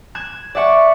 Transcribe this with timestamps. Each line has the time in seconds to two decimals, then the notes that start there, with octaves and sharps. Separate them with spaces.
0.15 F#6 G#6 E7
0.55 D5 E5 F#5 C#6